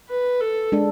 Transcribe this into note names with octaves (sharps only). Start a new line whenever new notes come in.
B4
A4
G#3 D4 A4